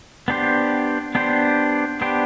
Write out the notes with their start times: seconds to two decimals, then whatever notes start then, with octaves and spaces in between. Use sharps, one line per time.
0.28 B3 D4 G4 C5
1.15 B3 D4 G4 C5
2.01 B3 D4 G4 C5